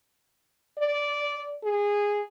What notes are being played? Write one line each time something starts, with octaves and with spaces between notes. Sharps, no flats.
D5
G#4